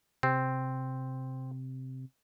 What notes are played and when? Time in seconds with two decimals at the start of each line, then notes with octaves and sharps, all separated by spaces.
0.23 C3 C4